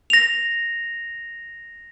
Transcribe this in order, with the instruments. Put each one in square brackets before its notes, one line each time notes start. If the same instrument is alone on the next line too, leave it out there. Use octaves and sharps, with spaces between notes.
[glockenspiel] A#6 F7